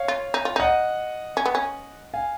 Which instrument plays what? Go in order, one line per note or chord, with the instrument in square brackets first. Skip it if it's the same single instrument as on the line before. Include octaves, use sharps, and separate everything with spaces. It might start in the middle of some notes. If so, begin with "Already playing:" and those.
Already playing: [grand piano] C#5 F5
[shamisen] F4
D#4
F4
[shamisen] D#4 [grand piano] D#5 F#5
[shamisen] C#4
B3
C#4
[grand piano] F5 G#5